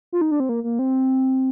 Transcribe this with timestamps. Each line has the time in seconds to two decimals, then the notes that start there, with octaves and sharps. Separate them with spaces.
0.13 F4
0.21 D#4
0.31 D4
0.40 C4
0.49 A#3
0.64 A#3
0.79 C4